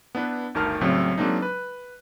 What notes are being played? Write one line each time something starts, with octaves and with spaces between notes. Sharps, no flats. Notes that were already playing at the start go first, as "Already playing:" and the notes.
B3 D4 E4 B4
G1 D2 D#3 A5 F6
C2 A2 C#3 F#3 C4
F#3 G#3 A#3 C4 D4 D#4
B4